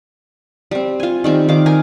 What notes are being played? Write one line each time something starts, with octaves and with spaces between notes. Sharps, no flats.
G3 C4
F4 G#5
D#3 G3 C4
D#3 F5 D6
A#4 G#5